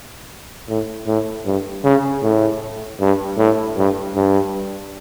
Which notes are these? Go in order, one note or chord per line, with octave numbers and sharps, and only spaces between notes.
A2
A2
G2
C#3
A2
G2
A2
G2
G2